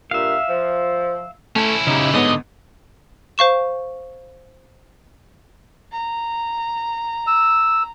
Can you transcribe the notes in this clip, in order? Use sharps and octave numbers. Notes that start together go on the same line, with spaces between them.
G2 A#2 E5 F5
F3
A3 C#4 E4
C#3 D#4 G4
G#2 D3 B3 D#5 D#6
C5 F5 C#6 E7
A#5
E6